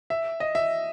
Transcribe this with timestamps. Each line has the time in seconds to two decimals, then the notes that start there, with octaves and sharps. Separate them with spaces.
0.10 E5
0.40 D#5
0.55 E5